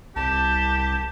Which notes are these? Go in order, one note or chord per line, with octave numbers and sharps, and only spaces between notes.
C2 G4 A5